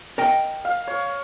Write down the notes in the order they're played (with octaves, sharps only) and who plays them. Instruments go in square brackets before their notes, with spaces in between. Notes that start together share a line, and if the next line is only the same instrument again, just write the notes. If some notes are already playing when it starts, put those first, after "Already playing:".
[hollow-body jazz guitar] A#4 D#5 G5
[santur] F5
C#5